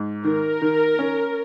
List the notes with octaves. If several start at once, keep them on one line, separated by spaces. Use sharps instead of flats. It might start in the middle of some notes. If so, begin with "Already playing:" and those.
Already playing: G#2
D#3 A#4
D#3
C#4